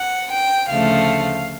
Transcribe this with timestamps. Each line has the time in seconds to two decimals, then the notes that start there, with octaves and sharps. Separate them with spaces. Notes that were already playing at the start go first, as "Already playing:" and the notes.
Already playing: F#5
0.31 G5
0.70 D2 C#3 F3 A3 F5